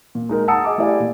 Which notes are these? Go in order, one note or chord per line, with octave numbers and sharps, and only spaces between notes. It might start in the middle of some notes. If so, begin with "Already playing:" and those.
A#2
G#3 D#4 A#4
F#5 A5 A#5 D#6 E6 C#7
G#4 D#5 D6
A3 E4 G4 D5 F5 G#5
A#2